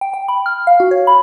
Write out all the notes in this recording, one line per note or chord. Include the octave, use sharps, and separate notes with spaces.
G5
G5
B5
F6
F5
F#4
C#5
B5